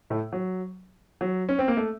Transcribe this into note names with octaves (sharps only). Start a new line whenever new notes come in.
A2 A3
F#3
F#3
C#4
C4
A#3
A3